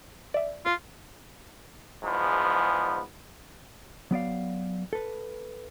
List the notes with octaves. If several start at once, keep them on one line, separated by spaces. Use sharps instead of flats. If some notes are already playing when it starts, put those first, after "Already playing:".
D5 E5
F4
E2 G#2 F3 B3
F#3 B3 D5 F5
A4 B4